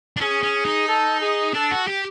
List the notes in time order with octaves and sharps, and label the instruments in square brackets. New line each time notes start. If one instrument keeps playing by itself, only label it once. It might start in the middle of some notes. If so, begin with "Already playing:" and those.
[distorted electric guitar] D4
[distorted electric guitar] C#4 [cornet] G#4
[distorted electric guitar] C#4
D#4
[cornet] A4
G#4
[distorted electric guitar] D4 [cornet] A4
[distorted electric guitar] F#4
G4